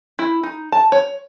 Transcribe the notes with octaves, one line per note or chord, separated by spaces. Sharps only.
E4
D#4
A5
C#5